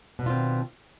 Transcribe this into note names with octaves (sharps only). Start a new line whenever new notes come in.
B2 D#3 C4 D4 F4